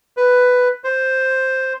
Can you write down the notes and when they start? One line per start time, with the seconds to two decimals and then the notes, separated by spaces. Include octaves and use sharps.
0.17 B4
0.84 C5